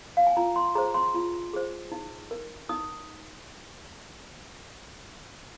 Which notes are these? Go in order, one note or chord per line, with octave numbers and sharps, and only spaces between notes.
F5
G#5
F4 A#5
C6
G#4 C5 A#5
C6
F4
G#4 C5
D#4
A#4
D#4 D#6